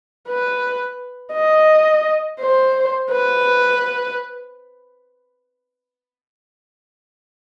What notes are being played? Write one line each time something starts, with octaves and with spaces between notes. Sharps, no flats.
B4
D#5
C5
B4